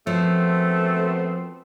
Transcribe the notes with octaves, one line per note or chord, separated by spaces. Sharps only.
F#2 F3 A3 B3 C4